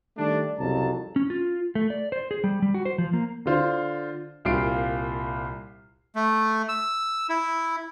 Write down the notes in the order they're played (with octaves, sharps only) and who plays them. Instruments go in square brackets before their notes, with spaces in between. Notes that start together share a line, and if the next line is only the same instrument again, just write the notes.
[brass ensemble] D#3 G3 A3 D4
C2 F2 C#3 F#3 A5 A#5
[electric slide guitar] C#4
F4
A3
D5
C5
G#4
G3
G3
F#4
C5
F3
A#3
[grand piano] D3 D4 F4 C5
C2 A#2 F4 C7 D7
[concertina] A3
E6
E4